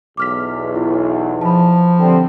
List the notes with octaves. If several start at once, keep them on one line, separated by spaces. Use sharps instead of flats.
B1 E2 D6 F6 B6
E4 F4
F3 A5 B5
D3 G3 C4